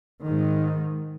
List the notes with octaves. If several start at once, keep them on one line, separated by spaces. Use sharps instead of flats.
G#2 D#3